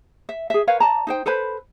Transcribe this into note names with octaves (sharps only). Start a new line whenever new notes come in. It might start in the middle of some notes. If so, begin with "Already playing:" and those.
E5
G#4 E5
A#4 B4 C#5 F5
D5 A5 A#5
D#4 C5 G5
A4 B4 C5 B5